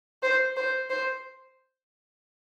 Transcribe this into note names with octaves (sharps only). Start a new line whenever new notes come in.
C5
C5
C5